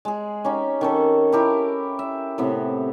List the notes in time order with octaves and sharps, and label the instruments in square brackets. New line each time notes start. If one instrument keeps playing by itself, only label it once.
[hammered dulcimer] G#3 G#4
C#4 D#4 G4
D#3 C#4 A4
E4 G4 A#4
E5
A2 C3 B3